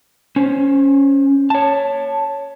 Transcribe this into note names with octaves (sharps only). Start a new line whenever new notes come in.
C#4 C5
C#5 A5